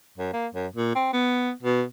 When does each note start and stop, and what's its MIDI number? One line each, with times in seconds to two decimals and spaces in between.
0.18 0.32 42
0.33 0.47 58
0.54 0.67 42
0.76 0.91 46
0.95 1.10 60
1.13 1.51 59
1.63 1.83 47